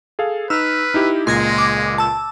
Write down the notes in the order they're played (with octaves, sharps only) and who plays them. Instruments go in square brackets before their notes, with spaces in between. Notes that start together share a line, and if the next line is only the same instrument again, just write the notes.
[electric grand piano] G#4 A4 F5
[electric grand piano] D#4 [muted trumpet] B4 [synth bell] E6 F6
[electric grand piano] D#4 E4 G4
[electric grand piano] C#2 A#2 [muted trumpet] G#3 [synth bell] C6 G#6 A#6
[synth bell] D6
A5 E6